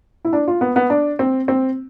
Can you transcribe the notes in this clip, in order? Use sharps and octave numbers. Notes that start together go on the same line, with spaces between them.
E4
D4
F4
B3
B3
D4
C4
C4